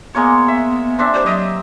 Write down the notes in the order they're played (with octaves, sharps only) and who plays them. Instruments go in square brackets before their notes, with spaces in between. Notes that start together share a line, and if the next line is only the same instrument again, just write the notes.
[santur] G#3 A#3 C#5 [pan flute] B3
[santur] E5
C4 D4 E5
[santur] G4 D5 [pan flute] C5
[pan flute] F#3 [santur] D#5 E5